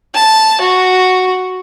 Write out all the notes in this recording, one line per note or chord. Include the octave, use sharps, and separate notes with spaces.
A5
F#4